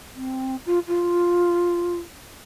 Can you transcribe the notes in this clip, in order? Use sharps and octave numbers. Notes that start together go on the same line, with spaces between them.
C4
F4
F4